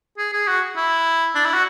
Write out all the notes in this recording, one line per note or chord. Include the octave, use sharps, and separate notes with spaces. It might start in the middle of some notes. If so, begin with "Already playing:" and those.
G#4
G#4
F#4
E4
D4
E4
F#4